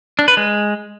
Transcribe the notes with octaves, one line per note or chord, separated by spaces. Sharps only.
D4
B4
G#3